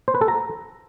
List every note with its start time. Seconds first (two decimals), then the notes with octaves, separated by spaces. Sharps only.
0.08 C5
0.15 B4
0.21 A4
0.28 A#5